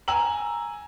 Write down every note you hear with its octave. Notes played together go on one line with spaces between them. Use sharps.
G#5 A#5 E6 F#7